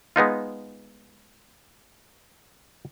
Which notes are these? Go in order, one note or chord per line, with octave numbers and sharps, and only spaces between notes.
G#3 B3 D#4 F4